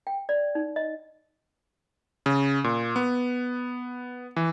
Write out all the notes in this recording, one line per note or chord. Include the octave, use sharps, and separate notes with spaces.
G5
D5
D#4
D#5
C#3
A#2
B3
E3